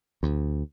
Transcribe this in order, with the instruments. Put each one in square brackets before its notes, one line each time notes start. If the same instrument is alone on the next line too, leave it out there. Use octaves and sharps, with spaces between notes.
[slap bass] D2